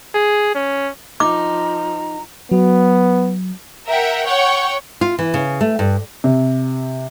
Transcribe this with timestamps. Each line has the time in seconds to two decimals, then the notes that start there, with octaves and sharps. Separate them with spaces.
0.14 G#4
0.55 C#4
1.20 F3 D#4 A#5 D6
2.51 F#3 B3
3.87 A#4 E5 F#5 G5
4.25 C#5 F#5 G5 C#6
5.01 F4
5.19 E3
5.34 C#3
5.61 A3
5.79 G2
6.24 C3